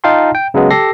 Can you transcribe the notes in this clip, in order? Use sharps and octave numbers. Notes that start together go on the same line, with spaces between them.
D#4 F4 F5 G5 A5 C6
G5
C#3 F#3 G#3 B3
G4 A4 A#6 C7